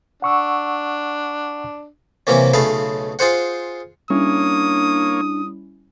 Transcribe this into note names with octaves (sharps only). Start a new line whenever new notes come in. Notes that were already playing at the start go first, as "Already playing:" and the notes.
D4 F#5 C#6 E6
C3 E3 F#3 A#3 C#4
B1 C#3 A3 G#4 F5 B5
F4 G#4 C5 F#5
G3 A#3 C#4 D4 E4 C#5 D#6